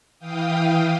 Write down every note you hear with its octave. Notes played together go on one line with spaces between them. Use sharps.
E3 F5 G5 D#6